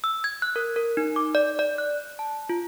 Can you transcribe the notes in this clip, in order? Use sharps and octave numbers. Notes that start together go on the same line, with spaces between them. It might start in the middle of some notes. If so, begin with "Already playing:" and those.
E6
G#6
F#6
A#4
A#4
D#4
D6
D5
D5
F#6
A5
F4